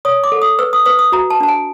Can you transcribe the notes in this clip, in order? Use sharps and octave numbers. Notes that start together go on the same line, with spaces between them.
C#5 D#6
D6
A4
D#6
B4 E6
D#6
B4 D#6
D#6
F#4 A#5
A5
D4 A5
G#5